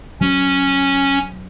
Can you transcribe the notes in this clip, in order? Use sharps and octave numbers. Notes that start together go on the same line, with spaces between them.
F#3 C#4